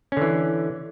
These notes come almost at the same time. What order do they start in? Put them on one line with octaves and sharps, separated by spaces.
C#4 D3 E3